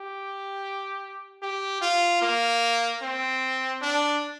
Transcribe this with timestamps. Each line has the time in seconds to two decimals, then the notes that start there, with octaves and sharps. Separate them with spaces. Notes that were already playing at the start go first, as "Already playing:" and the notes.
Already playing: G4
1.42 G4
1.81 F4
2.22 A#3
3.02 C4
3.82 D4